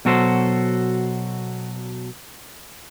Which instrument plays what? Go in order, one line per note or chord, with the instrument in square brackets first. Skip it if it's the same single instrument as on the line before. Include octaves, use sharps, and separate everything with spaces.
[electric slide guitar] B2 F#3 F#4 A4 C5